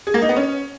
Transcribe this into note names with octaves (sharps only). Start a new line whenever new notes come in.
G#4
A#3
D#4
B3
C#4